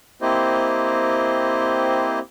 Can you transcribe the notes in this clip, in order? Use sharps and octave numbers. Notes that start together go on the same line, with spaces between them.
A#3 C4 E4 G4 C5 D#5